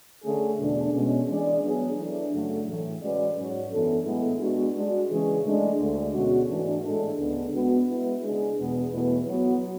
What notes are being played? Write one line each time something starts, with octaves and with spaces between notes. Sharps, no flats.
D3 A3 C#4 G#4
E2 B2 A3 D4
B2 G#3 C#4
E3 G#3 D4 G#4 D5
F#3 B3 D4 G#4
E3 A3 D4
F#2 C#3 F#3 A3
A2 E3 A3
G#3 C#4 F#4 B4 D5
G#2 F#3 C#4 F#4 C#5
F#2 E3 B3 D4 A4
A2 G#3 B3 E4 G#4
G#3 B3 D4 F#4
G#3 D4 F#4
C#3 E3 G#3 C#4 G#4
A2 G#3 D4
D2 D3 A3
B2 G#3 C#4 F#4
G#2 E3 A3 D4
A2 G#3 D4 A4
D2 C#3 G#3 B3 D4
G#3 B3 F#4
G#3 B3 E4 B4
C#3 G#3 D4 G#4
E2 B2 G#3 B3
E2 B2 A3 E4 B4
F#3 B3 F#4